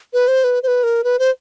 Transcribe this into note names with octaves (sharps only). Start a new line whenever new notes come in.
B4
C5
B4
C5
B4
A#4
B4
C5